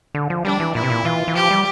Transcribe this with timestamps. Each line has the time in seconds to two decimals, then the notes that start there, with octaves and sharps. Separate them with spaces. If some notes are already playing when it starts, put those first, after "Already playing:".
0.15 D3
0.30 F3
0.45 G3 D4
0.60 E3
0.75 A#2 E4
0.83 C3
0.90 A#2
1.05 E3 F4
1.28 E3
1.35 F3 G4
1.51 G3